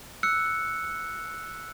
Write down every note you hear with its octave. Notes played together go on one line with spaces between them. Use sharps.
E6 F#6 C#7